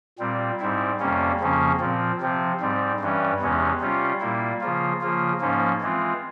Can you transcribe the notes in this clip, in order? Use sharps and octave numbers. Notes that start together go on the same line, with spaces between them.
A#2 G3 C4
G#2 G3 C4 E4
F2 C3 G3 A#3 C#4
F2 C#3 F3 A#3 C#4
A#2 F3 C4
C3 F3 C4
G#2 G3 C4
G2 E3 G3 C#4
E2 C3 E3 G#3 C#4
C3 G3 C#4 F4
A#2 G3 A#3 E4
C#3 F3 A#3 F4
C#3 F3 A#3 F4
G#2 F3 A#3 C#4
E3 G#3 C4 F4